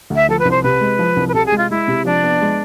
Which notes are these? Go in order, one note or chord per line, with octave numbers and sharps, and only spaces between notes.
D2
E5
F3 A4
B4
C2
C5
C3 B4
G#3
F3
C2
B4
C3 A4
G#4
G#3
F4
G#3 E4
C3
F3 D4
B3
G#3